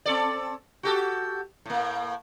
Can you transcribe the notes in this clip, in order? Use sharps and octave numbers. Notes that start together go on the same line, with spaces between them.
C4 A4 D5
F#4 G4 A4
A2 A#3